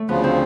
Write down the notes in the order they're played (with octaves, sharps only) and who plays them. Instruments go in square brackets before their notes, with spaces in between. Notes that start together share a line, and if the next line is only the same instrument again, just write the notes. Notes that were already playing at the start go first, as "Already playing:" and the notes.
Already playing: [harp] A3
[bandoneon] D2 C#3 F3 [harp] B3
[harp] C4